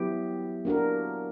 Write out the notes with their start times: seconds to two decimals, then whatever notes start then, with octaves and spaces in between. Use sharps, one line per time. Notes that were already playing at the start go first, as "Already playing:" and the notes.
Already playing: F#3 B3 E4 G4
0.65 A#3 D4 F#4 A#4